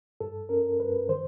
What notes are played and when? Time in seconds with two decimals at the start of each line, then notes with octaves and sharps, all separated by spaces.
0.20 G2 A4
0.49 C#4 A#4
0.80 G2 B4
1.09 D#3 C5